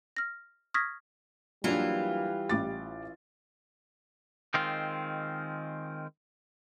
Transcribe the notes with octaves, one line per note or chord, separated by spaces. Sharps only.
F6 A#6
C#6 D#6 F6 G#6 A#6 B6
E3 F#3 G3 A#3 D4 F4
A1 D6 A6
D#3 G#3 C4 F4